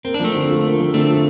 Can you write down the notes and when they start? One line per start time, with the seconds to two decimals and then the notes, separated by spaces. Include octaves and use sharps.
0.04 A#3 C4
0.14 D4
0.20 F3 A3 C4
0.34 D3
0.50 F4
0.65 A#3
0.80 F3
0.94 D3 A3 C4
1.09 F4